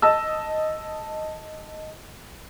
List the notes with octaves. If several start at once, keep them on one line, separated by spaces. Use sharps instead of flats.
D#5 A5 E6